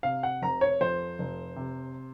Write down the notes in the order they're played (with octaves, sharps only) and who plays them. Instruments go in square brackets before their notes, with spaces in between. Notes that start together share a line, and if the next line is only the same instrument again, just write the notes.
[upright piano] C3 F5
F#5
F1 A#5
C#5
F2 C5
F1
C3